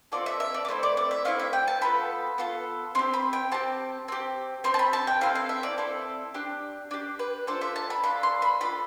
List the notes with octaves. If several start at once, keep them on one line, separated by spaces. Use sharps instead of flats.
A3 C4 F4 A4 D5
E5
E5
D5
D5
A3 C4 E4 C5
D5
D5
E5
A3 C4 E4 F5
E5
G5
A5
B3 F4 A4 B5
B3 F4 A4
C4 G4 C6
B5
G5
C4 G4 A5
C4 G4
C4 G4 C6
A5
B5
A5
G5
C4 E4 A4 F5
F5
E5
D5
C4 E4 A4
D4 G4
D4 G4
B4
D4 F4 A4 C5
E5
A5
B5
D4 F4 A4 B5
C6
B5
D4 F4 A4 B5